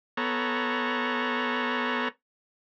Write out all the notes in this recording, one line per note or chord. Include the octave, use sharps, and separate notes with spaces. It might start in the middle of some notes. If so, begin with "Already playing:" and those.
B3 A4 C#5 A#5